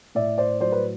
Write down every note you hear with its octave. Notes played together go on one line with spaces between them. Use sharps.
A2 D5 E5
C5 D5
F#3 C5 D5
B4